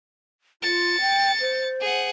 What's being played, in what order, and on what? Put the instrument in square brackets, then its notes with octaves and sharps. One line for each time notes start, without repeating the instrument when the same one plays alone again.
[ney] F4 [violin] A6 C#7
[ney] G5
C5
[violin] G#4 F#5